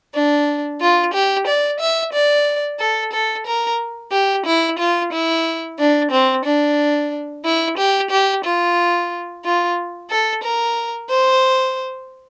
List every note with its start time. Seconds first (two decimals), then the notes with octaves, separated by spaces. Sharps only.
0.14 D4
0.81 F4
1.14 G4
1.47 D5
1.80 E5
2.13 D5
2.80 A4
3.13 A4
3.47 A#4
4.12 G4
4.46 E4
4.79 F4
5.12 E4
5.79 D4
6.11 C4
6.45 D4
7.45 E4
7.77 G4
8.11 G4
8.44 F4
9.45 F4
10.10 A4
10.44 A#4
11.10 C5